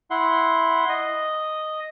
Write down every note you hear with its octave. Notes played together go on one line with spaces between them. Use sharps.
E4 F#5 C6
D#5